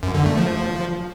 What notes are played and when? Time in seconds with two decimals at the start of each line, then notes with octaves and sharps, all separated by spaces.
0.03 F#2
0.14 D3
0.26 A3
0.37 F3